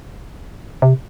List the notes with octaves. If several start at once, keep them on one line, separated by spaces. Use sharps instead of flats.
C3